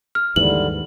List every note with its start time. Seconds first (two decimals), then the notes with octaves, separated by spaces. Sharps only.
0.15 F6
0.36 D#2 G#2 D3 E3 G3 F#7